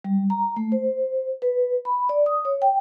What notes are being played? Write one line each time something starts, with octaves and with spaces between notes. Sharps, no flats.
G3
A#5
A3
C5
B4
B5
D5
D#6
C#5
G5